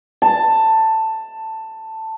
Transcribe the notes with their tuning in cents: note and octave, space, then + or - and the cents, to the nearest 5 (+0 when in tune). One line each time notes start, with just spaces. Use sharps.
A5 +10